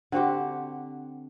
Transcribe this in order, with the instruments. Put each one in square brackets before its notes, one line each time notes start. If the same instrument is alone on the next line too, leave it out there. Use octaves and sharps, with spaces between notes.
[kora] D3 C4 F#4 G4